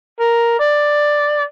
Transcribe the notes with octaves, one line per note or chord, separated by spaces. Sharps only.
A#4
D5